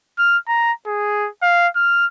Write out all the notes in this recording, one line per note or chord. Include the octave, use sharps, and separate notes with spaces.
F6
A#5
G#4
F5
F6